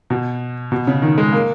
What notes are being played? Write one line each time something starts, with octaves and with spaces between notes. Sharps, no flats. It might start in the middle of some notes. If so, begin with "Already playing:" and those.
B2
B2
C#3
D#3
G#3
A#3